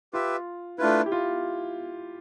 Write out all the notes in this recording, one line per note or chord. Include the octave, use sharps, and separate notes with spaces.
F4 G4 B4 E5
A3 D4 E4 F4 B4
G4
F4